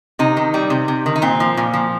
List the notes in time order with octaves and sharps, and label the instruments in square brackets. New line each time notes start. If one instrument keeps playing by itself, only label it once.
[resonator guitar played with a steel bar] C3 D#4
D#3
G3
C3
C3
D#3
D#4
A#2 C4
F3
A#2
F3